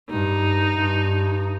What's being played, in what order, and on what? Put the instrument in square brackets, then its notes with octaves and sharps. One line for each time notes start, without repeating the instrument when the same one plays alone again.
[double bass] G2 [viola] D#4
[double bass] G2